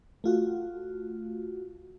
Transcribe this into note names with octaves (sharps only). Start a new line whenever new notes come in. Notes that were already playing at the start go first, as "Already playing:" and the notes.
A3 F4 F#4